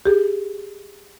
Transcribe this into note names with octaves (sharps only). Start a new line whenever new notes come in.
G4 G#4